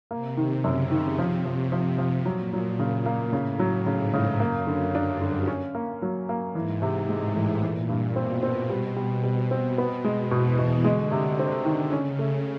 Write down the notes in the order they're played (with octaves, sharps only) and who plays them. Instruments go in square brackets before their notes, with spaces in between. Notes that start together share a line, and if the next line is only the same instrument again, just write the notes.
[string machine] C3 [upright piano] A#3
[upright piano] D#3
[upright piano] F#2 [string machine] C#3
[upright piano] D#3
[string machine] C3 [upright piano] F3
[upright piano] F3
[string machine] C3 [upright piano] F3
[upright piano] F3
[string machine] A#2 [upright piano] F#3
[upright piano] F#3
[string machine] A#2 [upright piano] C#3
[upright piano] A#3
[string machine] A2 [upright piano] C#3
[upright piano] F#3
[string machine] G#2 [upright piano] C#3
[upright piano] C#3
[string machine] F#2 [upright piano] A#3
[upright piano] D3
[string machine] G2 [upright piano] D4
[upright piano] D3
C#4
A#3
F#3
A#3
[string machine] G#2 [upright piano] E3
[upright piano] C3
[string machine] A2 [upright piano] G#3
[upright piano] E3
[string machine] A#2 [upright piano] E3
[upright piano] G2
[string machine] B2 [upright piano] C4
[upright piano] C4
G3
G3
[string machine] B2 [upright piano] G3
[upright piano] C4
B3
G#3
[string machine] E2 E3 [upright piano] B2
[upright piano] B2
[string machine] D3 [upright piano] G#3
[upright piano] C3
C4
D#3
[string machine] C#3 [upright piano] C#4
[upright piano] A3